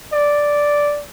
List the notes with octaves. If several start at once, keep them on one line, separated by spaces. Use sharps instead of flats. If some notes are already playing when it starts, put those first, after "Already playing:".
D5